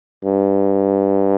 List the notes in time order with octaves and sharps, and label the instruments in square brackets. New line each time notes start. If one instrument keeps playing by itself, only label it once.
[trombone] G2